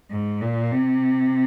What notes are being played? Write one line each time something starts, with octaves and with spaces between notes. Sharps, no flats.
G#2
A#2
C3